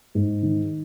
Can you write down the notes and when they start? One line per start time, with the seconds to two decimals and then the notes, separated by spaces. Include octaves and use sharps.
0.15 G#2
0.43 D#3